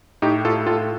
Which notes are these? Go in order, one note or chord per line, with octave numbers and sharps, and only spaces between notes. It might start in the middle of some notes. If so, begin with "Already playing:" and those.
A2 D#4 G4
A2 F4 A4
A2 F4 A4